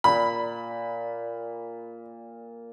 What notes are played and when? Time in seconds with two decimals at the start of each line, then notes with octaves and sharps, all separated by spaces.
0.04 A#2 B5